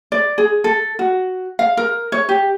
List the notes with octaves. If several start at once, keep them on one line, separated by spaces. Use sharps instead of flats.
D5
G#4
A4
F#4
F5
A#4
C#5
G4